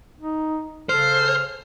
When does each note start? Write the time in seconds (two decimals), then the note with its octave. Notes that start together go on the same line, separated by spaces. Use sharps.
0.17 D#4
0.89 C#3 A4 C5 F6